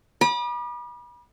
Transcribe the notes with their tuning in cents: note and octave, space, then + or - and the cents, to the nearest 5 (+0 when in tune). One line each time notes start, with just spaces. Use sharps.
B5 -35 D6 +45